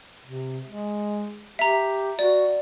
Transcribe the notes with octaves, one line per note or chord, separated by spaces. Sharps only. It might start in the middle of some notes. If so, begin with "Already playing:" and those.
C3
G#3
G4 E5 A#5
F#4 D5